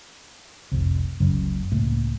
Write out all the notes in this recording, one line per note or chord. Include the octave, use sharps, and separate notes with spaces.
F1 C2
F#1 C#2 F#2 C#3
C#2 A2 A3 A#3